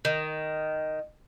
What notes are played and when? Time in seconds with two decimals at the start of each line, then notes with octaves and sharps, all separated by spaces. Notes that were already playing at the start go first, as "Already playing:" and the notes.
0.05 D#3